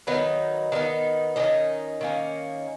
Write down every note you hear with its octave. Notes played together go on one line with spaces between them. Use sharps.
D#3 F#3 B3 D#4 B4
D#3 F#3 B3 D#4
D#3 A#3 C#4 D#4 D#5
D#3 A#3 C#4